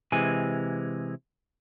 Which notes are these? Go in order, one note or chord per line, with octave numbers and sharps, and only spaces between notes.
C3 E3 G#3 G#5